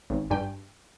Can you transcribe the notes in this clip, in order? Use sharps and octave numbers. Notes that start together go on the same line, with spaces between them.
G#1
G2 G5